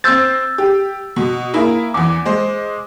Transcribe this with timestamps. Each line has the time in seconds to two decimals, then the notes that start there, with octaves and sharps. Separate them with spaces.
0.04 C4 C5 E6 G6 A6
0.58 G4
1.16 B2
1.54 A#3 E4 G#4
1.94 E2 E3 D6
2.26 G#3 C5